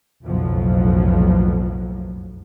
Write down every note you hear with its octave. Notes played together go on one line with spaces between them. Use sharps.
F#1 B1 F2 A2 F3 F#3